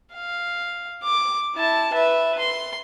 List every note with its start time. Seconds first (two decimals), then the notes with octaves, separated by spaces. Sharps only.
0.14 F5
1.03 D6
1.55 E4 A5
1.93 B4 E5
2.39 C6